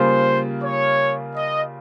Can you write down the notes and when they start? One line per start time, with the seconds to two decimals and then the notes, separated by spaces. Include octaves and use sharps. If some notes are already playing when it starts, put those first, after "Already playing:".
Already playing: C#3 G3 A#3 F4 C5
0.62 C#5
1.36 D#5